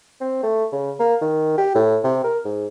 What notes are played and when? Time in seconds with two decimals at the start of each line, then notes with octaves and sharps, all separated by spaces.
0.21 C4
0.43 A3
0.72 C#3
1.00 A#3
1.21 D#3
1.58 G4
1.75 A2
2.04 C3
2.24 A#4
2.45 G#2